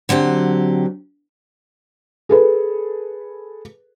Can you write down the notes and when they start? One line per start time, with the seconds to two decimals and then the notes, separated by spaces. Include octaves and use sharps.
0.09 D3 F#3 C4 G4
2.29 G#4 A4 B4